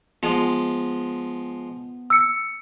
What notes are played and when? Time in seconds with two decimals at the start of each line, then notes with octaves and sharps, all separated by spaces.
0.23 F3 G#3 B3
2.10 E6 C#7